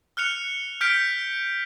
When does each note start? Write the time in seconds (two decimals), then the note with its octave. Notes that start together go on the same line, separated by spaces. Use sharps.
0.17 F6 F#6 C#7 F7
0.81 F6 G6 B6 D7